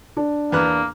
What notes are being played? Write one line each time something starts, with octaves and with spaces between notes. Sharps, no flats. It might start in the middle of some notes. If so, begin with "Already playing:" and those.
D4
E2 A#3 B3 F#6